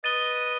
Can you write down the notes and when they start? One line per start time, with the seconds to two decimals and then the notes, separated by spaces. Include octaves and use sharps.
0.04 B4 D#5 A6 D#7 G7